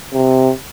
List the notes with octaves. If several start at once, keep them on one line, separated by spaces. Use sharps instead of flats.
C3